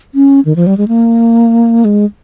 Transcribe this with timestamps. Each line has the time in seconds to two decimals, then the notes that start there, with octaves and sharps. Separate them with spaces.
0.15 C#4
0.45 D#3
0.56 F3
0.67 G3
0.77 G#3
0.88 A#3
1.85 G#3